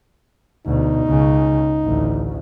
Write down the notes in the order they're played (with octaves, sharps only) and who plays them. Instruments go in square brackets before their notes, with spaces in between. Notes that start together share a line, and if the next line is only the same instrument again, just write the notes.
[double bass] D2 B2 [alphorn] D#4
[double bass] C#2 C#3
A1 D2